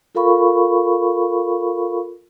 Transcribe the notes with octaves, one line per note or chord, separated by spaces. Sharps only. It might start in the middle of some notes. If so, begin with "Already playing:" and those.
F4 A4 A#4 F5 B5 C#6